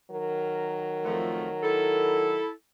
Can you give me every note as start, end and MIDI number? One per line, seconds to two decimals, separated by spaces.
0.11 2.42 51
0.11 2.42 54
0.11 2.42 70
1.04 1.47 41
1.04 1.47 53
1.04 1.47 57
1.63 2.50 64
1.63 2.50 69